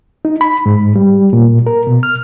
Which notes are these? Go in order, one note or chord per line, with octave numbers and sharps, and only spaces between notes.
D#4
B5
G#2
G3
A#2
A#4
B2
F6